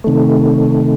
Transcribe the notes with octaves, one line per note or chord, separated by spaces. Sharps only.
C3 D#3 A3